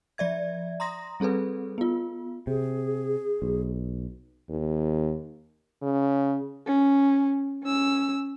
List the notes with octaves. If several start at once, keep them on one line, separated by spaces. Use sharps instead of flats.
F3 D5 E5 G#6
A#5 C6 D#6 A#6
G3 C4 G#4 A4 B4
B3 F4
C3 G#4
B1
D#2
C#3
C#4
C#4 E6